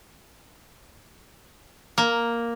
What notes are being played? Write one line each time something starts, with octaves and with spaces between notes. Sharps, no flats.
A#3